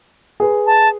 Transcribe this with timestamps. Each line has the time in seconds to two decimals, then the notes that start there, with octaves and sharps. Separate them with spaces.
0.40 G#4 B4
0.66 A5